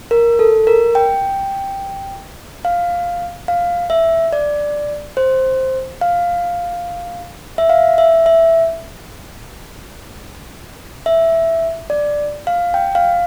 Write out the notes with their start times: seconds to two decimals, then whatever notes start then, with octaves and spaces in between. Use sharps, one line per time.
0.11 A#4
0.39 A4
0.67 A#4
0.95 G5
2.65 F5
3.48 F5
3.90 E5
4.33 D5
5.17 C5
6.01 F5
7.58 E5
7.70 F5
7.98 E5
8.26 E5
11.06 E5
11.90 D5
12.47 F5
12.74 G5
12.95 F5